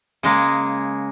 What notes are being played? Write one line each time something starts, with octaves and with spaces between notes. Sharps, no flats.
C#3 G#3 A#3